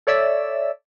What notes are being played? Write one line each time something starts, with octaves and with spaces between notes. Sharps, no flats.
A4 C#5 D5 E5 E6